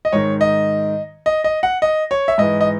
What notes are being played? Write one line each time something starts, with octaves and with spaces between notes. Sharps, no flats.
D#5
G#2 D#3 C#5
D#5
D#5
D#5
F#5
D#5
C#5
E5
G#2 E3 D#5
D#5